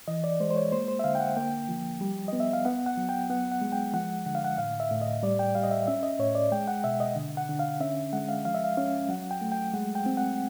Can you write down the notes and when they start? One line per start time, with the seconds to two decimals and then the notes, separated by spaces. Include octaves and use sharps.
0.08 E3 D#5
0.24 D5
0.40 G#3 C5
0.51 C5
0.56 C#5
0.72 A#3 C5
0.88 C5
0.99 E5
1.04 D3 F5
1.15 G5
1.20 F#5
1.37 A#3 G5
1.69 F3
2.01 G3
2.28 B3 D#5
2.40 E5
2.53 F5
2.65 B3 F#5
2.86 F#5
2.97 F#3
3.09 G5
3.30 B3 F#5
3.52 F#5
3.62 G#3
3.72 G5
3.93 F3 F#5
4.26 D3 F#5
4.35 F5
4.45 F#5
4.58 A2 F5
4.80 E5
4.91 A2
5.01 D#5
5.23 G3 D5
5.39 G5
5.55 G3 F5
5.63 D#5
5.71 E5
5.87 C#4 E5
6.03 D#5
6.19 A2 C#5
6.35 D5
6.52 G#3 G5
6.68 F#5
6.84 B2 E5
7.00 D#5
7.16 D3
7.37 F#5
7.49 D3
7.59 F5
7.80 C#4 E5
8.13 G#3 F#5
8.29 F5
8.45 F3 F5
8.54 E5
8.64 F5
8.77 C#4 F5
9.09 F#3 F#5
9.31 G5
9.41 A3
9.52 G5
9.73 G#3 F#5
9.95 G5
10.06 C4
10.17 F#5